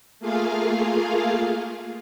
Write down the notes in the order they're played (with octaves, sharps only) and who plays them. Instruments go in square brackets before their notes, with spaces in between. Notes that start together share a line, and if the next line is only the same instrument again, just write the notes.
[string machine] A3 A#3 F4 G#4 F5